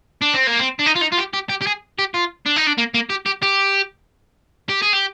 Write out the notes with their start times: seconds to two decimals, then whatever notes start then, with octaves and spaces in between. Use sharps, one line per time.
0.22 D4
0.34 C4
0.47 A#3
0.60 C4
0.80 D4
0.87 D#4
0.96 F4
1.02 D#4
1.12 F4
1.18 G4
1.34 G4
1.49 G4
1.61 G4
1.67 G#4
1.99 G4
2.14 F4
2.46 D4
2.56 D#4
2.67 D4
2.78 A#3
2.94 A#3
3.10 G4
3.26 G4
3.42 G4
4.69 G4
4.82 G#4
4.93 G4